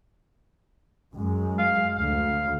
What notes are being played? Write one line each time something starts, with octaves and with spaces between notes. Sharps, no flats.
F#2 G#3
F5
D2 D3 F5